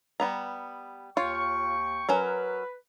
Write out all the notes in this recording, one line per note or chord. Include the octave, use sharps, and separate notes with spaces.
G3 B3 A#5
D#2 F4 C#5 G5 C#6
F#3 C#4 A#4 B4